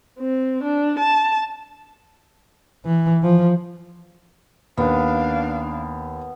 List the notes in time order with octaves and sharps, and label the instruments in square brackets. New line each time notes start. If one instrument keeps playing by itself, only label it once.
[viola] C4
D4
A5
[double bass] E3
F3
[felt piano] D#2 [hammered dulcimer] B3 [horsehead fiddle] D4 F5